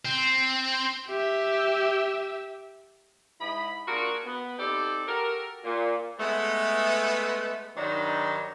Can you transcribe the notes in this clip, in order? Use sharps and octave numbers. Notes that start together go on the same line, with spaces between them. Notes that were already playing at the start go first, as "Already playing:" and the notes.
C4
G4 E5
G#2 E4 D#5 B5
A#3 D4 F4 F#4 G#4 A#4
B3
C4 D#4 G4 A4 D5
F#4 G4 A4 A#4
A#2
G#3 A3 B3
G2 D#3 F#3 D4 D#4 C5